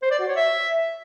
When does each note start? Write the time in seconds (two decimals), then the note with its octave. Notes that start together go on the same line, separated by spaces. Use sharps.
0.02 C5
0.11 D5
0.19 F#4
0.28 C#5
0.36 E5